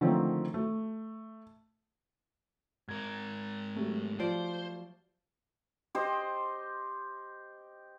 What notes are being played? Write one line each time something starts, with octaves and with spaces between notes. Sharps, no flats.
D3 D#3 F3 A3 A#3 C4
A3
G#2 A#4 G#6
F#3 G3 A3
F3 C5 D5
G4 C5 D#5